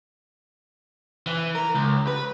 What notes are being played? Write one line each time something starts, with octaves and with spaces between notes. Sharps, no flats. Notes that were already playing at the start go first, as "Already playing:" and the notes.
E3
A#4
C#2
B4